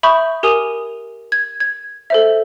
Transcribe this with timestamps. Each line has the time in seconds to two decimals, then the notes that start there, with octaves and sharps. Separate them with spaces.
0.03 E5 B5 C#6 D#6 G6
0.43 G4 A#4 G#5 D#6 D#7 F7
1.32 G#6
1.60 G#6
2.10 A4 C5 E5